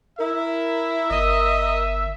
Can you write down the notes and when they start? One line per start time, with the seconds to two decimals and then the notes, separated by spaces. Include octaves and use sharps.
0.19 E4 A#4 E5
1.10 G1 D#5